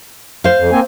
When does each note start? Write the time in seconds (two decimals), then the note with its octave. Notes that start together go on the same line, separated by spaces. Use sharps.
0.44 C5 F5
0.58 F2
0.72 A#3 C4 G#5